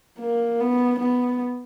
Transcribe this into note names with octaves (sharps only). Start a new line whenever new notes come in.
A#3
B3
B3